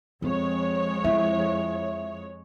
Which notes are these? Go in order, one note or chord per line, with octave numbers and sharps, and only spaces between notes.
F2 G#3 C4 C#5
E4 E5